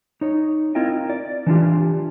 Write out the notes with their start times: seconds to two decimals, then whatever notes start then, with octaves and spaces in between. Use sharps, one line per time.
0.21 D#4 C#5
0.75 C4 E4 F4 A#4 D#5 G5
1.10 D5
1.47 E3 D4 F4 G4